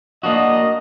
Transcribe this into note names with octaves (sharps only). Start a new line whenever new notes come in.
A#3 D4 F#4 D#5